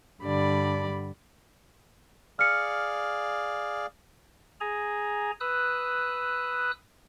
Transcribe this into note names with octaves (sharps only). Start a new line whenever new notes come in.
G2 D3 G3 D5 B5
G#4 D5 F5 F6 C#7
G#4 G#5 A#5
B4 D#6 E6 F#6